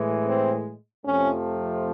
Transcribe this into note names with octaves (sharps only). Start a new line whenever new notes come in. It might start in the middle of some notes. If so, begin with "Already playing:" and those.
Already playing: A2 E3 G#3
C4
F2 C3 F3 A3 C#4